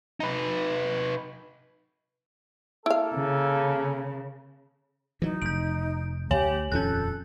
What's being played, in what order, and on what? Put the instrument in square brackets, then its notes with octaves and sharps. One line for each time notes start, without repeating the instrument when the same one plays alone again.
[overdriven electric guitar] D#4 B4
[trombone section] A#3 A4 [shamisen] E4 F5
[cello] C#3
[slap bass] E3 F#3 [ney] D#4
[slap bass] F1 [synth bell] G6 D7
[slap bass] D2 [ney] G4 [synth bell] C#5 G#5 F#7
[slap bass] D#1 F2 C#4 [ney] A4 [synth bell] F#6 G6